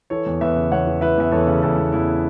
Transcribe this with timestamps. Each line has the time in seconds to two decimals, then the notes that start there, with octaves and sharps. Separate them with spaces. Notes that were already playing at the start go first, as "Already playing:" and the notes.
0.10 E3 A4 C#5
0.26 E2
0.41 E2 B4 E5
0.56 C#3
0.72 E2 C#5 F#5
0.86 E3
1.01 E3 B4 E5
1.17 E2 E5
1.32 E2 A4 C#5
1.47 C#3
1.62 E2 E4 A4
1.78 E2
1.92 E2 E4